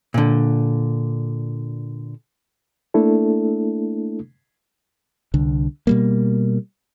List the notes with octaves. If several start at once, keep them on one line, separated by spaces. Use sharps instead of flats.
A#2 D3
A3 A#3 D4 E4 A4
C2 D3
B2 G3 A#3